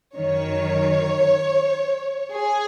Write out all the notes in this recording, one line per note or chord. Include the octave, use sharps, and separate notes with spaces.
F#2 D#3 C#5
G#4